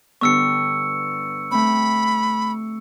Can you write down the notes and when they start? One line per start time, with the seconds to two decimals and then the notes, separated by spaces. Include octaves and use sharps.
0.21 G2 D3 B3 C#6 E6 C#7
1.51 A3 C4 B5